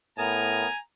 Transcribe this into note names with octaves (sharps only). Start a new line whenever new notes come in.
A2 B3 A#4 G#5 A#5 D#6